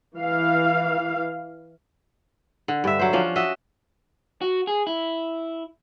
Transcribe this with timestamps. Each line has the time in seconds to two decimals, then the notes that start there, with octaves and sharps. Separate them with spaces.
0.17 E3 F5
2.68 D3
2.84 G2 E5
2.99 F#3 C5
3.13 F3 C#4 D4
3.36 F#4 D#5 E5
4.41 F#4
4.67 G#4
4.87 E4